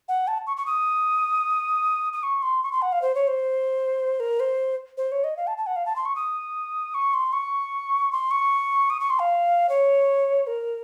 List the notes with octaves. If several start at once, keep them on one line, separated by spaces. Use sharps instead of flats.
F#5
A5
C#6
C#6
D#6
D#6
C#6
C6
C#6
C6
F#5
F5
C5
C#5
C5
A#4
C5
C5
C#5
D#5
F5
A5
A5
F#5
F5
A5
C6
C#6
D#6
C#6
C6
C#6
C6
C#6
D#6
C#6
C6
F5
C#5
A#4